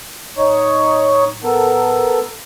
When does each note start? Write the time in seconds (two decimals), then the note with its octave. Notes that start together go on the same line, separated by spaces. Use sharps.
0.37 D1 D#4 C#5
1.44 B3 A4 A#4